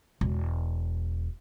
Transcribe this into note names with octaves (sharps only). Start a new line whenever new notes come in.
E1